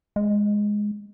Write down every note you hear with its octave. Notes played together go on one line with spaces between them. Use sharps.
G#3